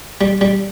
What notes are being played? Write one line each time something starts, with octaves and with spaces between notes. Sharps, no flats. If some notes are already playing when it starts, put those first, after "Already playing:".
G3
G3